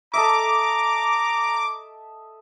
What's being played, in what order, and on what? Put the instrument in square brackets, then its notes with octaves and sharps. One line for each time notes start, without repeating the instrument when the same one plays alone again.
[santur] A4 D#5 E5 [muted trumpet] A#5 [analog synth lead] D6